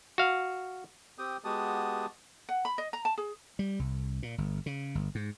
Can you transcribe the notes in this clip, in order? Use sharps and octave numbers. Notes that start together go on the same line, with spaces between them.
F#4 F5
C4 G4 G5 D#6
G#3 B3 F#4 G4 A5 D#6
F#5
B5
D#5
A#5
A5
G#4
G3
C2
A#2
G1
C#3
G1
G#2